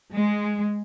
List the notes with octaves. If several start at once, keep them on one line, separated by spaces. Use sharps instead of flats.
G#3